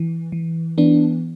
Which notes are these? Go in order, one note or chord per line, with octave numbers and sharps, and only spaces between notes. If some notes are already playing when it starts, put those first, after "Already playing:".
Already playing: E3
E3
E3 B3 D4